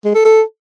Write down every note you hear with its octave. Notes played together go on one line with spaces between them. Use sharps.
G#3
A4
A4